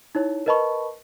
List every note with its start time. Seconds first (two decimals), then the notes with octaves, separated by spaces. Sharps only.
0.15 D#4 E4 C#5
0.46 A#4 B4 D#5 A5 B5 C#6